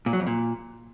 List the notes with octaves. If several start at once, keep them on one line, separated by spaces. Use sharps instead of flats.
A#2
F#3
F2
A#2